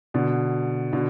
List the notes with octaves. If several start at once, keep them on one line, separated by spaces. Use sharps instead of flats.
B2 D3
B2 D3